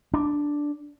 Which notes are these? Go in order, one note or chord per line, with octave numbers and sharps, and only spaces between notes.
D4